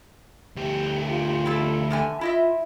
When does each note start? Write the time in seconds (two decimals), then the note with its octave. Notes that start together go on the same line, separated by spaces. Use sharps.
0.56 D2 G4
1.10 F4
1.46 E4 A4
1.91 E2 D3 G#5
2.21 E4 F4 D#5 E5